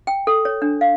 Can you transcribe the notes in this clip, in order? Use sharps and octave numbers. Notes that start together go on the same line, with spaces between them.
G5
A4
C#5
D4
F5